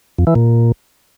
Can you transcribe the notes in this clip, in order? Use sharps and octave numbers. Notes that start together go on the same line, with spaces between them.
F2
E3
A#2